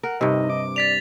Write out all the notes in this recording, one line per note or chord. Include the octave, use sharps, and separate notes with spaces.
A#4 F#5
G2 C3 D#4 D#5
D6
D5 A6 B6 F7